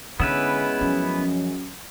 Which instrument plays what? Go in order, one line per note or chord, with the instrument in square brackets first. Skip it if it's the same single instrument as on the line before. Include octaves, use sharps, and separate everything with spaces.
[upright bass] D3 [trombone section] G#3 C#4 [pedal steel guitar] B3 E4 B4
[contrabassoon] F#2 [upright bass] F3